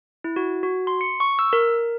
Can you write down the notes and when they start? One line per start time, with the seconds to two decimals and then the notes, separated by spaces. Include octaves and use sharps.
0.24 E4
0.36 F#4
0.63 F#4
0.87 C6
1.01 C#7
1.20 C#6
1.39 E6
1.53 A#4